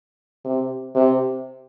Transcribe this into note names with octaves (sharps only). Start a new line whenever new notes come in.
C3
C3